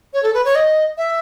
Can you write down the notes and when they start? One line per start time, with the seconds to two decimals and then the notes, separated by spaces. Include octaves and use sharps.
0.14 C#5
0.23 A4
0.34 B4
0.45 C#5
0.55 D#5
0.98 E5